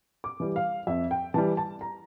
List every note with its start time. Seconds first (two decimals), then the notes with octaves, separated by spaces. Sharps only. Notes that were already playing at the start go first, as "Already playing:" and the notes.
0.24 D6
0.40 E3 G3
0.56 F5
0.87 F2 E5
1.11 G5
1.34 E3 G3 A5
1.57 A5
1.81 A#5